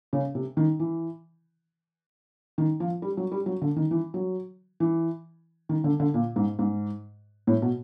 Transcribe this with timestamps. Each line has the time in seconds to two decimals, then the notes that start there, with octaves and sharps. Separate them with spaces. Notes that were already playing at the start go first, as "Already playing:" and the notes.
0.13 C#3
0.35 C3
0.57 D#3
0.79 E3
2.58 D#3
2.80 F3
3.02 G3
3.17 F#3
3.32 G3
3.46 F#3
3.62 D3
3.76 D#3
3.91 E3
4.14 F#3
4.80 E3
5.69 D#3
5.84 D3
6.00 D3
6.14 A#2
6.36 G#2
6.59 G#2
7.47 A2
7.62 B2